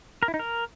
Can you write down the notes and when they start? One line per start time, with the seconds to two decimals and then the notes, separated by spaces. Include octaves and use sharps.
0.23 A#4
0.28 E4
0.34 D#4
0.39 A#4